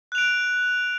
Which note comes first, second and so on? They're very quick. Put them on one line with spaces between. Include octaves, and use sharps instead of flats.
F#6 F7 D7